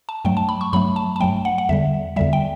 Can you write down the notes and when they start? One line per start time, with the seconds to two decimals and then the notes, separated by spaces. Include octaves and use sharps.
0.09 A5
0.25 G2 F#3 A3 G5
0.37 A5
0.49 B5
0.61 C#6
0.73 G2 F#3 A3 B5
0.96 A5
1.16 A5
1.20 G2 F#3 A3 G5
1.45 F#5
1.58 F#5
1.69 E2 D3 G3 E5
2.16 E2 D3 G3 E5
2.33 G5